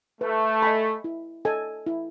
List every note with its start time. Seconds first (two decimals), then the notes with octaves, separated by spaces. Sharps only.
0.21 A3 B4
0.62 D#5 G#5 B5
1.04 E4
1.45 A4 D#5 G#5
1.86 E4